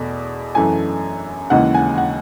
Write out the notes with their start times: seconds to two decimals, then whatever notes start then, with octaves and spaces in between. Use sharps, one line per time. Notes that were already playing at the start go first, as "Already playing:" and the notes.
Already playing: E2 B2 A3
0.55 F#2 E3 A3 G#5
1.50 D#2 C#3 E3 G#3 F#5
1.74 G#5
1.98 F#5